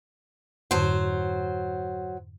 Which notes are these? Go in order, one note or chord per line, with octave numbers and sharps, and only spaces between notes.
F2 G#2 D3 F#3 C5